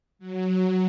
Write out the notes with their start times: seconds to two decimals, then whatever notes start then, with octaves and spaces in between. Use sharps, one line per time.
0.19 F#3